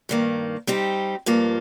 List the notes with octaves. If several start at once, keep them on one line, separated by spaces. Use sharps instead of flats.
G2 D#3 A#3
G3 C4 D#4 G4
G2 F3 A#3 F4